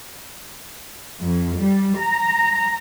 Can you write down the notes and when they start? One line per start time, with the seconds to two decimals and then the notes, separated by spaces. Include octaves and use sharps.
1.20 F2
1.57 G3
1.99 A#5